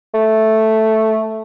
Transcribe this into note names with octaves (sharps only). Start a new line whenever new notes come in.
A3